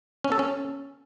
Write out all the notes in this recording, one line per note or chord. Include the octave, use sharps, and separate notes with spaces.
C#4
A4
C#4